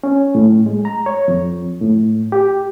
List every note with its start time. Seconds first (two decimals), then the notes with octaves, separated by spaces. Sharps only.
0.04 C#4
0.35 A2
0.66 G#3
0.85 A#5
1.06 C#5
1.28 F2
1.81 A2
2.32 G4